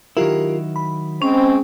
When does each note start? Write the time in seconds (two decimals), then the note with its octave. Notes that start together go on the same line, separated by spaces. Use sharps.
0.17 D#3 F#3 E4 F4 G4 A#4
0.76 B5
1.22 G#3 C4 C#4